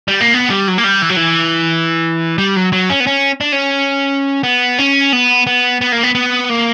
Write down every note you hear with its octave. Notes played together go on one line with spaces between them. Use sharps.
G3
A#3
B3
G3
F#3
A#3
G3
E3
F#3
E3
G3
F#3
F#3
C#4
B3
C#4
D4
C#4
B3
C#4
B3
B3
B3
A#3
B3
B3
A#3